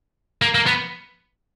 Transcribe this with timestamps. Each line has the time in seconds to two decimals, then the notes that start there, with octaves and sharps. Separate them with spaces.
0.42 A#3
0.55 A#3
0.66 B3